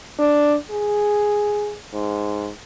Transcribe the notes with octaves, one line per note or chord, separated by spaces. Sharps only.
D4
G#4
G#2